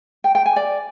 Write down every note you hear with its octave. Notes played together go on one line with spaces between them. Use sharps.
G5
G5
G#5
D5